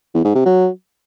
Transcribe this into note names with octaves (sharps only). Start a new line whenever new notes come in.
E2
G#2
C3
F#3